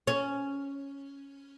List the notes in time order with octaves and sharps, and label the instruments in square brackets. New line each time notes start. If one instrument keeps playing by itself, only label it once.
[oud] C#4